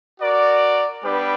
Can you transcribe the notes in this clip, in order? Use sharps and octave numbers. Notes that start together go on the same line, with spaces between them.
F#4 A#4 D5
G3 B3 D4 G4 B4